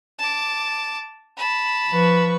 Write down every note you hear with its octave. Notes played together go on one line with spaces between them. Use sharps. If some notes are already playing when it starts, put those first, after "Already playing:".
A5 D6
A5 B5
F3 B4 C#6